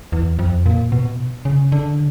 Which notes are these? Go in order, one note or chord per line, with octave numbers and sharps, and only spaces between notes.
E2
F2
A#2
B2
C#3
D3